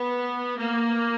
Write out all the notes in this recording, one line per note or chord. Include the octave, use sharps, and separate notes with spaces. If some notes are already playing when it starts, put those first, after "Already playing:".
Already playing: B3
A#3